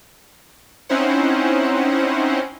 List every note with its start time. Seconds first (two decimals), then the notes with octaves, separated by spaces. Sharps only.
0.89 C4 C#4 D#4 E4 C5 F#5